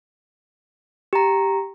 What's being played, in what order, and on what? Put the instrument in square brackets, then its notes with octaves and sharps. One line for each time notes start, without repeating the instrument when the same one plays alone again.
[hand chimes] G4 A#5